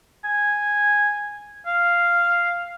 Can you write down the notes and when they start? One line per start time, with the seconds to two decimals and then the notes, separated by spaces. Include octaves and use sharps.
0.24 G#5
1.67 F5